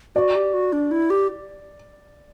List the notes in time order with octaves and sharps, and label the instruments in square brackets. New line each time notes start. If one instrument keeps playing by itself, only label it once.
[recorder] F#4 [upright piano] D5
[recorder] G4
F#4
D4
E4
G4